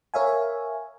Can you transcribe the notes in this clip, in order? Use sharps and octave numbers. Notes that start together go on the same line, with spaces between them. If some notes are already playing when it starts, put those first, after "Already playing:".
A#4 C#5 E5 F5 G#5